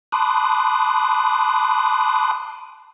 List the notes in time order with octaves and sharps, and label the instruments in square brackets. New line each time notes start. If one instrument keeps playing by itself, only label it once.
[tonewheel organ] A5 B5 C6 D6 D#6 F#6